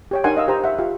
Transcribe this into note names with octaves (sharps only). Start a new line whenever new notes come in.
G4 C#5 G5
D4 D#4 A#4 F#5 G#5 C6
D#5 F5 E6
G4 C5 A#5
E5 F#5
F4 G4 F5